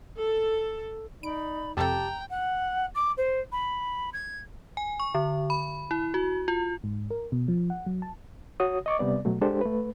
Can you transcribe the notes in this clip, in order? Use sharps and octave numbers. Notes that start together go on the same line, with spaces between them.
A4
D#4 D5 B5 D7
F2 C3 G4 A4 G5 A5 A#5
F#5
D6
C5
B5
G#6
G#5
C#6
D3
B5
E4
F#4
F4
G#2
A#4
B2
F3
F#5
F#3
A5
F#4 C#5 D#6
D#5 C#6 D6
C3 G3 B3 D5
B2 F#3 A3
G#3 D4 G4 A4 C5
A3 B4